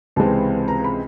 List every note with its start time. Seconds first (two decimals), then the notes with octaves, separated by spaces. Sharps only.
0.16 C#2 C3 E3 G#3 C4 A5
0.68 A#5
0.84 B5